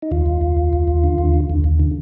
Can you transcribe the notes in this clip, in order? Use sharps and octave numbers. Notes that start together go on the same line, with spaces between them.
D#4
D#2 F4
D#2
D#2
D#2
D#2
D#2
D3
D#2
D3
D#2
D#2
D3